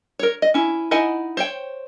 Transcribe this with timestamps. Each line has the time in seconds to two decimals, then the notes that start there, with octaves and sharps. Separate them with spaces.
0.19 A#4 C#5
0.42 D#5
0.54 C#4 E4
0.91 D#4 E4 D#5 F#5 G#5
1.37 C5 C#5 G5